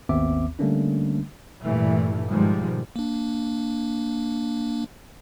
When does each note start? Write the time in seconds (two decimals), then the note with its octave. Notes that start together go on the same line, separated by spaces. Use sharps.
0.09 G#1 D#2 B3 C4 E5 D6
0.59 D3 G3 A3 A#3 C#4 D4
1.63 G2 A#2 E3 A3
2.28 G#2 B2 D#3 F3 G3 G#3
2.96 A#3 D4